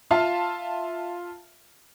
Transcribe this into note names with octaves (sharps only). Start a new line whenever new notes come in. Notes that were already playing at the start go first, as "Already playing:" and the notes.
F4 E5 F5 A5